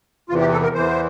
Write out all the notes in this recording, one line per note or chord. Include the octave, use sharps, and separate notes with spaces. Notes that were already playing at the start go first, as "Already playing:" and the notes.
E2 C3 E3 F4
G4
A4
A#4
E2 E3 C5